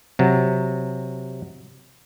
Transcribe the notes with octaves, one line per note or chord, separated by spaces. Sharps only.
C3 F#3